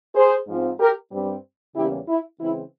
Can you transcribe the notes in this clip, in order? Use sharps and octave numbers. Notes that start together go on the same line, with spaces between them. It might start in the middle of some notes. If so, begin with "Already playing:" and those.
G#4 C5
G#2 F3 C4
G4 A#4
G2 G3 C4
E2 C#3 G3 A#3 C#4 E4 G4
E4
C#3 E3 G#3 C4 E4